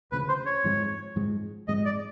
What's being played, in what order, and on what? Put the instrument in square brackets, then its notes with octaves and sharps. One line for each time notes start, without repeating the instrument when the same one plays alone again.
[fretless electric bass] D2 C#3 F3 [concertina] B4
[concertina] C5
C#5
[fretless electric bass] G#2 F3 G#3 C4
G#2 F3 G#3 C4
[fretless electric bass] G#2 F3 G#3 C4 [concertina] D#5
[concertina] D5